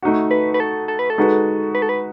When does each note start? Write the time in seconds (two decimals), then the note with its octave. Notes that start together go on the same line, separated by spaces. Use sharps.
0.02 A3 D#4 F#4
0.31 B4
0.54 B4
0.60 A4
0.88 A4
0.99 B4
1.10 A4
1.18 G#3 D#4 F#4 B4
1.75 B4
1.82 A4
1.89 B4